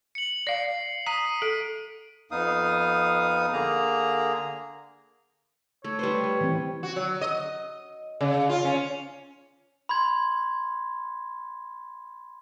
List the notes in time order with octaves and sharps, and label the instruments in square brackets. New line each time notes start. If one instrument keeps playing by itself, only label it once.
[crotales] C#7 F#7
[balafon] D5 F5 [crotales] C7
[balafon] A#5 [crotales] D#6 B6 D#7
[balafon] A4 [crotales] D7
[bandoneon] F2 B3 D#4 F5 D#6
D3 A#3 G#4 A#5
[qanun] A3 [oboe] C#5
[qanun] G3 B4 C5
B4
[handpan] E3 C4
[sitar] F#4
F#3
D#5
C#3
F4
C#4
[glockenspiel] B5 C6 G#6